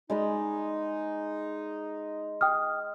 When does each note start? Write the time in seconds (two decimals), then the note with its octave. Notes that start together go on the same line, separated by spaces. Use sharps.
0.10 G#3 D#4 D5 B5
2.41 G5 D#6 F6